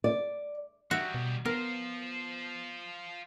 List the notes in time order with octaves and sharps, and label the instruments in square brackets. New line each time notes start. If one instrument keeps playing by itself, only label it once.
[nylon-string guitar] D5
[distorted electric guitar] D#3 G3 [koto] F#4 E5
[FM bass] B2
[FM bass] B3 [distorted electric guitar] F4 C5 [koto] A#4